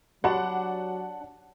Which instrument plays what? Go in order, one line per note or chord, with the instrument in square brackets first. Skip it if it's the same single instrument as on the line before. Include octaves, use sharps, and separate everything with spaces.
[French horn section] F#3 [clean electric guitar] D4 [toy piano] F#4 G4 B5 [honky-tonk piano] F#5